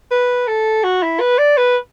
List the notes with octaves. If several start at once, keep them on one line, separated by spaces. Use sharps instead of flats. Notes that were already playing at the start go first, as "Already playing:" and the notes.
B4
A4
F#4
E4
B4
D5
B4